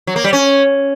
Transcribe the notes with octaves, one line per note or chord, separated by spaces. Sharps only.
F#3
A#3
G3
C#4